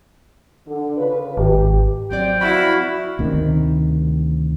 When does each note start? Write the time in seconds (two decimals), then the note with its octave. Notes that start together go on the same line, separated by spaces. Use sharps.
0.68 D3
0.97 C#3 F4 B4
1.37 G#1 G4
2.11 F#3 C4 D5 G5
2.41 E4 F#4 F5 B5
3.19 D2 C3 D#3